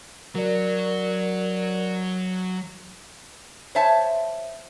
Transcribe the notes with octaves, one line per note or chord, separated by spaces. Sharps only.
F#3 A#4 D5
C5 C#5 E5 A5